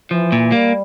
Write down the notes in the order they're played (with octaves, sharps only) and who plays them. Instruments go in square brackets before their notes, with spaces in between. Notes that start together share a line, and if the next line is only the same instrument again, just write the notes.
[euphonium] E3 [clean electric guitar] F3
[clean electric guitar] A#2
[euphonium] G3 [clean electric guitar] A#3